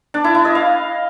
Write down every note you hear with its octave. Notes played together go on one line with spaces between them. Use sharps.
D4
E4
E4
D#5
F5